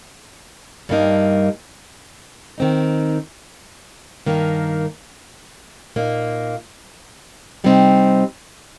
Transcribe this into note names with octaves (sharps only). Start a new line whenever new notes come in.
G2 G3 A#3 D#4
D#3 C4 D#4
G2 D#3 A#3
A#2 A#3 D#4
C3 G3 C4 D#4